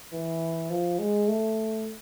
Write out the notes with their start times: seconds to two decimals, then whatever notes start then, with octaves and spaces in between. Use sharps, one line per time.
0.13 E3
0.70 F3
0.99 G#3
1.28 A3